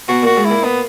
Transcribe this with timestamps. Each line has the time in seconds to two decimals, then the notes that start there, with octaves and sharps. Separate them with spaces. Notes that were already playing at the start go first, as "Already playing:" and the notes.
0.08 B2 F#4
0.23 A#2 F#4
0.36 G#2
0.45 A#2 E4
0.64 B3